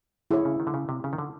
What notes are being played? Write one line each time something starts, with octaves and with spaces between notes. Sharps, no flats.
D3 E4 G#4 C#5
C#3
D#3
D3
C#3
C3
C#3
D#3
D3